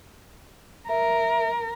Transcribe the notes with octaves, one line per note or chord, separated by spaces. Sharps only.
A#4 E5